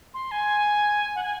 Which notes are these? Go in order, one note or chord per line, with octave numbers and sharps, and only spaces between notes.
C6
G#5
F#5
G#5